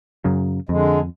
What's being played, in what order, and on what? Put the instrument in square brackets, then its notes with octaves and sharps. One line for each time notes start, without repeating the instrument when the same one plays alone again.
[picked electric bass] F#2 C#3 F#3
[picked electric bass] F2 [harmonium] D3 G#3